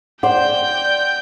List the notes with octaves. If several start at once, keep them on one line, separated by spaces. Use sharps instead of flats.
C5 D5 F#5 G5 G6